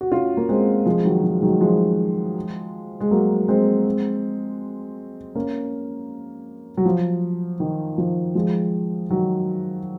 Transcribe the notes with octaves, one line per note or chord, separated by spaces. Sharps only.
F#4
C#4 F4
A#3
G#3 C4
F3 G#3
D#3 F#3
F3
G#3
D#3 F#3
F3 G#3
G#3
F#3 A#3
G#3 C4
A#3 C#4
F#3
F3
D#3
F3
F3 G#3
D#3 F#3